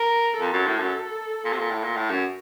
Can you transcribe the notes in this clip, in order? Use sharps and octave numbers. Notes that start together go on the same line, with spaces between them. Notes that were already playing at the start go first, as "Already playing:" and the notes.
Already playing: A#4
F2 A4
F#2
A2
F#2
A#2
C3
A#2
A2
A#2
A2
F#2